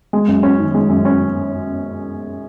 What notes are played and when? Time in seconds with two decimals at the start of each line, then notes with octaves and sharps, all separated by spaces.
0.13 G#3
0.28 F#2
0.43 C#4
0.59 D#3
0.74 G#3
0.89 F#2
1.05 C#4